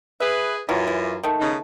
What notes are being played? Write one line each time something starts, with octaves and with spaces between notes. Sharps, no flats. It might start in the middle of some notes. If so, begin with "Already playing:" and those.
G#4 B4 E5
F#2 E3 F#3 F4
E3
D#3 A3
C#3 B3 D#4